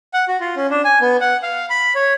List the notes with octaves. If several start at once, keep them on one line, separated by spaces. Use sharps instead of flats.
F#5
F#4
F4
C#4
D4
G#5
B3
F#5
F5
B5
C#5